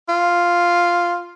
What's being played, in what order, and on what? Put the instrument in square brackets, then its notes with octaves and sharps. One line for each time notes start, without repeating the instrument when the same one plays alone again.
[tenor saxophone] F4